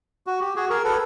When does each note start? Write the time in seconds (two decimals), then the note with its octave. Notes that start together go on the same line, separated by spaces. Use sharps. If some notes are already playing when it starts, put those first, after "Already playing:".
0.27 F#4
0.41 G4
0.56 F#4 G#4
0.69 G#4 A#4
0.84 A4 B4